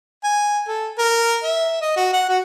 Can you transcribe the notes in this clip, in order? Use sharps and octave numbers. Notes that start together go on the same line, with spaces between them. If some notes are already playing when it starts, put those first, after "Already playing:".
G#5
A4
A#4
E5
D#5
F#4
F#5
F#4